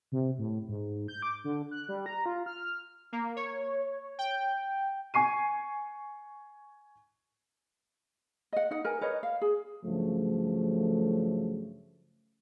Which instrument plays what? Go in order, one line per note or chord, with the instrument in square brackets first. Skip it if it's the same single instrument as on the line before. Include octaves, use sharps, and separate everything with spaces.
[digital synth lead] C3
A2
G#2
G6
D6
D3
F#6
G3
A#5
F4
F6
[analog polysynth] A#3
C#5
G5
[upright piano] G#5 C#6 C7 D#7
[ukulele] D#5 F#5
D#4 F#5
A#4 B4 G#5
A#4 B4 C#5 D#5
F5
G#4
[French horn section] G2 C#3 F3 F#3 A3